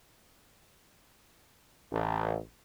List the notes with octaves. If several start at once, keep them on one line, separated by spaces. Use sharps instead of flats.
A1